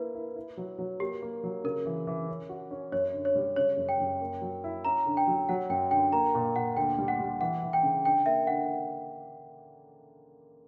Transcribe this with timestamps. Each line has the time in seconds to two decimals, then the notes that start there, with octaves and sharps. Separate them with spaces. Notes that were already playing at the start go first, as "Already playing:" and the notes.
Already playing: A#3 E4 B4
0.14 E4
0.36 E4
0.57 F#3
0.78 F#3
1.00 A#3 G4
1.22 A#3
1.44 F#3
1.64 C#3 A#4
1.86 E3
2.07 E3
2.29 C#4
2.49 F#4
2.71 C#4
2.92 F#2 C#5
3.14 D3
3.25 C#5
3.36 G3
3.56 C#3 C#5
3.77 F#2
3.89 G5
4.00 F#2
4.21 A#3
4.42 F#3
4.64 E4
4.85 C#4 A#5
5.06 D3
5.17 G5
5.27 F#3
5.49 F#3 F#5
5.70 F#2 G5
5.91 D3 G5
6.13 A#3 A#5
6.35 A#2
6.56 A#2 F#5
6.76 D2 G5
6.98 G3
7.08 F#5
7.19 G3
7.40 E3 F#5
7.63 E3
7.73 G5
7.83 C#3
8.05 D4 G5
8.26 A#3 E5
8.47 D3 F#5